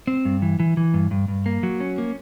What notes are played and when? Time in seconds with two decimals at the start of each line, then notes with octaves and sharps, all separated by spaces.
0.07 C4
0.25 G2
0.42 E3
0.60 E3
0.77 E3
0.94 G2
1.11 G2
1.28 G2
1.46 A#3
1.63 F#3
1.81 C#4
1.98 A#3